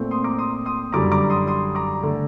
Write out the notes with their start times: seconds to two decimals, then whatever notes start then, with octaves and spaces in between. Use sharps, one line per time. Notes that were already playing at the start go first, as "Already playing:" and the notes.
Already playing: A#2 A3 C4
0.11 C6 D#6
0.24 A#5 D6
0.38 C6 D#6
0.65 C6 D#6
0.92 F#2 D3 G3 A#5 D6
1.12 A#5 D6
1.30 C6 D#6
1.47 C6 D#6
1.75 A#5 D6
2.03 D3 A3